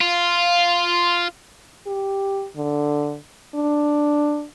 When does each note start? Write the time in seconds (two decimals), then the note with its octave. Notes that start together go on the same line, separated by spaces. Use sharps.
0.01 F4
1.87 G4
2.56 D3
3.54 D4